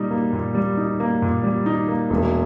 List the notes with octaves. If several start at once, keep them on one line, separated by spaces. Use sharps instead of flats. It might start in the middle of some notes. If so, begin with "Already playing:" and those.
Already playing: A#2 G3 D#4
A#3
A#2
G3
D#4
A#3
A#2
G3
D#4
A#3
E1